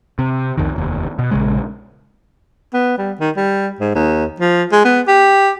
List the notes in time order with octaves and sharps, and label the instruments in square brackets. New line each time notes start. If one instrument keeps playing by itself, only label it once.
[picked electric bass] C3
C2 F2 D#3
F1 D#2
B2
A#1 C#3 G#3
[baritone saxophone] B3
G3
D#3
G3
G#2
D#2
F3
G#3
B3
G4